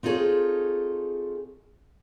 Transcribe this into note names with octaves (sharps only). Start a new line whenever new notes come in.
C4 D#4 F4 G#4 A4 C#5